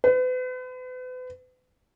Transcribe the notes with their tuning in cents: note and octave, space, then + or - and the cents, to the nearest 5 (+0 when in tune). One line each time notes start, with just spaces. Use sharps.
B4 +40